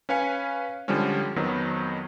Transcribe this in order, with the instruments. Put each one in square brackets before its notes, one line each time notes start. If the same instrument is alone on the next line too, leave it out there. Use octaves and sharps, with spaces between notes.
[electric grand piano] C#4 B4 F5 G#5 C#7
D3 F3 G3 G#3 C#4
F2 D#3 F#3 B3